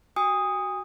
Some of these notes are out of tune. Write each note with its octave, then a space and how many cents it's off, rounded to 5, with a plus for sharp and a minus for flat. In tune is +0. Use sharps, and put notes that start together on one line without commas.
F#4 +15 G#5 -40 D#6 +0